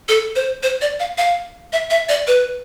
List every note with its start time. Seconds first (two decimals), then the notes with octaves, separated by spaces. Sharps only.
0.09 A4
0.35 C5
0.63 C5
0.81 D5
1.00 F5
1.18 F5
1.73 E5
1.90 E5
2.09 D5
2.27 B4